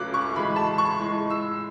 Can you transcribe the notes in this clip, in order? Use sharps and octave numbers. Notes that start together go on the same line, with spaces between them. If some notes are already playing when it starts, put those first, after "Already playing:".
Already playing: C#2 C#3 F#3 A3 D6 F#6
C#6
A2 E3 G#3 B5
A5
C#6
A2 G#3
E6